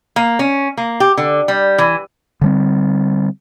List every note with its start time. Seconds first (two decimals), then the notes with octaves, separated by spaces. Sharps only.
0.16 A#3
0.39 C#4
0.77 A#3
1.00 G4
1.17 D3
1.48 G3
1.78 E3
2.41 D3 G3 C4